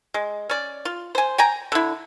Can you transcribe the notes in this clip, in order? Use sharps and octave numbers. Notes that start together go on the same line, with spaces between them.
G#3
C#4 D5
F4
C5 G#5
G5 G#5 A#5
D3 E4